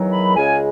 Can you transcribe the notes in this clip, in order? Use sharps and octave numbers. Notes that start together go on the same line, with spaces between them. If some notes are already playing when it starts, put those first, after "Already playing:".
Already playing: E2 D#3 F#3
B5
C#2 C#3 G#3 G#5